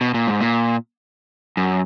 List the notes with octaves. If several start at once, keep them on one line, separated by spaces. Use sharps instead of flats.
B2
A#2
G#2
A#2
F#2